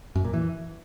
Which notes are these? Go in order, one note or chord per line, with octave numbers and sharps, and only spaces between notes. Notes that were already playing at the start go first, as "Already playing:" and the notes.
F#2
A#2
E3